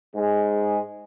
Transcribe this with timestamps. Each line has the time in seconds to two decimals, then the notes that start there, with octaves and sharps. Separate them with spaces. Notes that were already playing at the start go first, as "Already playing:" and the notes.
0.15 G#2 G#3